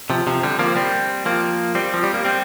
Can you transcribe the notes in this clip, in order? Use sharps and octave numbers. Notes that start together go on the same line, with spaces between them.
C3 F3
C3 F3
D3 G3
F3 A#3
G3 C4
F3 A#3
G3 C4
F3
G3
A#3
G3 C4